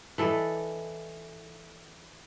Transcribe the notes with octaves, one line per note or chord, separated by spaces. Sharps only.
E3 A4 D5 D#5